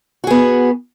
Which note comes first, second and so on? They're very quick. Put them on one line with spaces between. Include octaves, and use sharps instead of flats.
F#4 G#4 B3